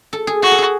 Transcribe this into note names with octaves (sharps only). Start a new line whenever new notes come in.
A4
G#4
F#4 G#4
A4
G#4